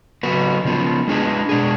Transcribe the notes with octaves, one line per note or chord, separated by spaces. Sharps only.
C#3 F#3 B3 F#4 B4
C#3 F3 B3
G#3 D4 G#4 B4
B2 G#3 D4 G#4